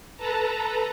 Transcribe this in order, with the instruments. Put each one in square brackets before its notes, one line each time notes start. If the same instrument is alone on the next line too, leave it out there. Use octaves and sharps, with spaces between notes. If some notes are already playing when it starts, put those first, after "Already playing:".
[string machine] A4 B4 A5 A#5